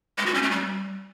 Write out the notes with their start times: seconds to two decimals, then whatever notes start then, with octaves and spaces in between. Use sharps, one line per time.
0.18 G#3
0.26 F#4
0.34 C#4
0.42 A3
0.51 G3